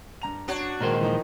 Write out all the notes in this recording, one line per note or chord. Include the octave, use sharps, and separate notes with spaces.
G2 A#5 F7
D4 F#4 C#5
A#2 D#3 G#3 A#4 C5
E3 F3 D#4